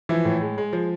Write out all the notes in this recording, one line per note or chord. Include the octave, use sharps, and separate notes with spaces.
E3 F3 E4
A2
G#3
G#3
F3